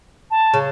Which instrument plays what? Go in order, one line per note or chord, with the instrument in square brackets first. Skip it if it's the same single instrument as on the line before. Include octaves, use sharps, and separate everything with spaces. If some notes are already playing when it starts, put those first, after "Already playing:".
[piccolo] A5
[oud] C#3